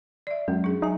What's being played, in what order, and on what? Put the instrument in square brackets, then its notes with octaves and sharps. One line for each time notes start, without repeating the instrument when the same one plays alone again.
[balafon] D5 E5
[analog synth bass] F#2 [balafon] G#3
[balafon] D4 G#4
[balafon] F#3 G#5 [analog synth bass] D#4